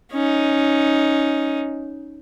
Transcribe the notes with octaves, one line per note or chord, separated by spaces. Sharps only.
C#4 D#4